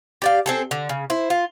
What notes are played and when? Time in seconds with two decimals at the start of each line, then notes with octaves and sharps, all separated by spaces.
0.22 G4 D5 F5
0.46 C4 G#4 A4
0.71 D3
0.89 C#3
1.10 E4 C5
1.30 F4